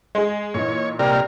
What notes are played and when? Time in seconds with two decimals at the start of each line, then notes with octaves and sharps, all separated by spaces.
0.15 G#3 G#4
0.54 A#2 E3 D#4 C#5
0.99 C3 G3 A#3 A#4